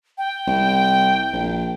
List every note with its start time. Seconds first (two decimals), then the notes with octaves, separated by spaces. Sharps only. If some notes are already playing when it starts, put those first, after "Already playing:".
0.18 G5
0.47 C2
1.33 A#1